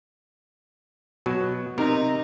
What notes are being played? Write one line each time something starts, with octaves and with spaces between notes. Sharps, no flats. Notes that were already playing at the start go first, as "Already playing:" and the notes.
B2 F#3
C3 C4 D#4 A#4